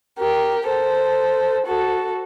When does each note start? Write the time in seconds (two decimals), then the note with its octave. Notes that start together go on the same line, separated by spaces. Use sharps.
0.18 G4 A#4
0.68 A4 C5
1.66 F#4 A4